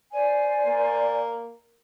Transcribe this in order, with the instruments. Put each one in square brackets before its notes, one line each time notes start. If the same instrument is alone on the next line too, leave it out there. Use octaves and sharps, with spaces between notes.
[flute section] C5 D5 G#5
[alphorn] A#3